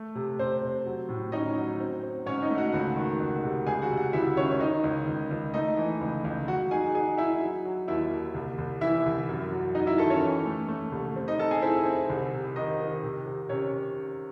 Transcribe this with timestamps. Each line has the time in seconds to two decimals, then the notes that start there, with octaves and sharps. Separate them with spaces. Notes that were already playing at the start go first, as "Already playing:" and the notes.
Already playing: A3
0.15 C3
0.39 C3 C4 C5
0.62 C3
0.86 F#3
1.09 A2
1.32 C#4 D#4 D#5
1.56 F#3
1.80 C4
2.03 C4
2.26 G#2 C#4 C#5
2.42 D#4 D#5
2.50 A3
2.57 F#4 F#5
2.72 C#2 F#4 F#5
2.97 D#3
3.20 C#2
3.43 C3
3.66 C#2 G#4 G#5
3.82 F#4 F#5
3.90 C3
3.97 F#4 F#5
4.13 C#2 E4 E5
4.37 D#3 C#4 C#5
4.52 C#5
4.60 D#3 D#4 D#5
4.84 C#2
5.07 C#2
5.31 C#2
5.54 A3 D#4 D#5
5.77 E3
6.01 C#2
6.24 C#2
6.48 F#3 F#4 F#5
6.71 D#4 G#4 G#5
6.95 D#4 G#4 G#5
7.18 D#4 E4 E5
7.41 F#3
7.65 F#3
7.88 D#2 E4 E5
8.11 D#2
8.35 C2
8.58 C2
8.81 E3 E4 E5
9.06 C2
9.29 F#2
9.52 F#3
9.75 F#3 D#4 D#5
9.87 E4 E5
9.98 D#3 A4 A5
10.10 C#4 C#5
10.22 E3
10.46 A3
10.69 A3
10.92 C2
11.16 C4
11.28 D#4 D#5
11.39 C4 A4 A5
11.51 G#4 G#5
11.62 C4 E4 E5
11.85 C4
12.09 C2
12.33 C3
12.56 D#3 D#4 D#5
12.80 D#3
13.03 C3
13.26 C3
13.49 C3 C#4 C#5